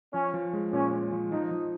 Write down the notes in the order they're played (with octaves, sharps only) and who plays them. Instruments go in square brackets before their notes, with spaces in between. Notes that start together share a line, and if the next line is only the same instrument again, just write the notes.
[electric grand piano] F3 [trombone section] C#4
[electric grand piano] F3
G#3
[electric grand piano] A#2 [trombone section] C#4
[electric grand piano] G#3
F3
[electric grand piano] F3 [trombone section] D#4
[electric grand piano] F3